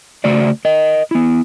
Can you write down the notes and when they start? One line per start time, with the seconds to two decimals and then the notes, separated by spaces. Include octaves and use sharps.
0.24 C#3 A3 F#4 C5 D5
0.65 A#4 D#5
1.11 B3 E4